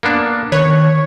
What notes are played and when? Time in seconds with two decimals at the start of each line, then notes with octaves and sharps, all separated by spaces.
0.03 A#3 B3 D4
0.52 D#3 B4 C#5